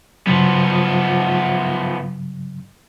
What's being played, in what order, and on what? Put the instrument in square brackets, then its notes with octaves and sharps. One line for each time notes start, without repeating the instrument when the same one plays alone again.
[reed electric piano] G2 C#3 F#3 [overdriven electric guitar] F3 B3